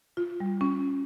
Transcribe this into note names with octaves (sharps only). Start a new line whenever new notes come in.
F4
G3
C#4